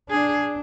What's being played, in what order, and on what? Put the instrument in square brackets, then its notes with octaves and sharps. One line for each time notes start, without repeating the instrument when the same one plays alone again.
[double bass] D4 [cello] G#4